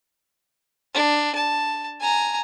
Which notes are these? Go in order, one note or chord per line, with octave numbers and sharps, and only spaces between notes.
D4
A5
G#5 A#5